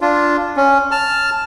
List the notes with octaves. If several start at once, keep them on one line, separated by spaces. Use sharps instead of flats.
D4 F4
C#4
A5 F6